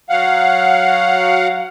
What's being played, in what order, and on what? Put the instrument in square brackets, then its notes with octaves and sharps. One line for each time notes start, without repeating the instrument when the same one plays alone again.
[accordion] F#3 F5 F#5